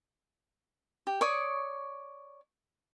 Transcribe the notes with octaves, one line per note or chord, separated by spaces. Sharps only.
G4
C#5 D5 C#6 D#6